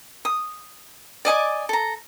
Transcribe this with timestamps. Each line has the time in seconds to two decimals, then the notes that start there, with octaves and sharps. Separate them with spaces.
0.25 D#6
1.25 D5 D#5 G#5 D6
1.69 A4 A#5